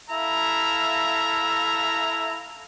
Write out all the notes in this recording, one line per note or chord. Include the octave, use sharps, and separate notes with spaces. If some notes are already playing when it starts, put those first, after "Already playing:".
E4 A4 E5 F5 A#5